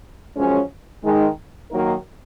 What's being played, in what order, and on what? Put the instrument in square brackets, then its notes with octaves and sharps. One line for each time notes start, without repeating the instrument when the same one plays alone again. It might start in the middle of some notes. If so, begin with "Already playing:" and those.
[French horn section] F#2 F3 G#3 C#4
D#3 G#3 D#4
D#3 F#3 A#3 D#4 A#4